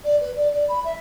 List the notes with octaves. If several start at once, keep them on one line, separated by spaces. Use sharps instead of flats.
D5
B4
D5
D5
B5
E5